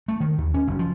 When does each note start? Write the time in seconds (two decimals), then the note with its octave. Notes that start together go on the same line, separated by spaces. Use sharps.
0.08 A3
0.20 D#3
0.38 D#2
0.54 C#4
0.67 F#1
0.79 F3